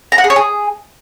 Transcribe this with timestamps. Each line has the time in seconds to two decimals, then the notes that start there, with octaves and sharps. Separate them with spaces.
0.12 A#5
0.18 F#5
0.24 G#4
0.30 C#5
0.36 G#4